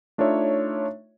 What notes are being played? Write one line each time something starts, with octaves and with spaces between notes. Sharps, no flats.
A3 D4 D#4 F4 C#5 E5